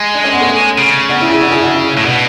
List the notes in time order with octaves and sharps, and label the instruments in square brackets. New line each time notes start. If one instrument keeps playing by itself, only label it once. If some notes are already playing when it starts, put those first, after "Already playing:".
Already playing: [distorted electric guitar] G#3
[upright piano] D4
C#4
B3
A3 C#4
[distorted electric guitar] C#3
[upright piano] B3 D4
C#4 E4
E4 G#4
D4 F#4
E4 G#4
D4 F#4
C#4 E4
[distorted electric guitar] A2
[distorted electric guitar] B2 [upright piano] B3 D4